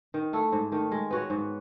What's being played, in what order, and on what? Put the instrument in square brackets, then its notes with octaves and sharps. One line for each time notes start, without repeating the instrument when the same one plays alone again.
[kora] D#3
A3 E4 A4
G#2
D#3 A3
G#3
B3 F#4 C#5
G#2